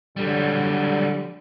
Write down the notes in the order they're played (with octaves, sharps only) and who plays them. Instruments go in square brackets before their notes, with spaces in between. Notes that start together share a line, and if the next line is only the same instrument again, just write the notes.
[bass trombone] D3 [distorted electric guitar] F#3 G3